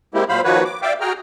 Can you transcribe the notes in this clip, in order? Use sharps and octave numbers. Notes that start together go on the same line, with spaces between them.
G#3 A#3 C4 E4 G4
A#2 F#3 C5 F5 B5
D#3 F3 A#3 F#4 B4 C#5
D6
D5 E5 F5 G5 D6
F#4 G#4 G5 A#5 F6